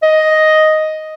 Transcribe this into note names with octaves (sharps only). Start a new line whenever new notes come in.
D#5